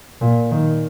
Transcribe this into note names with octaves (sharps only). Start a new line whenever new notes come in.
A#2
D#3